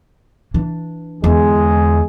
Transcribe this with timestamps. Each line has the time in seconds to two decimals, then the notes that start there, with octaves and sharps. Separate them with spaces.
0.54 E3 D4
1.24 E2 D3 G#3 G#4